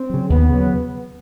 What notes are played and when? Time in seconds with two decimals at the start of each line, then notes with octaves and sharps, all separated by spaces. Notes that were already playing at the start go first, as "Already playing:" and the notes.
Already playing: C4
0.10 C#3 F#3
0.30 D#2 B3
0.49 C#3 F#3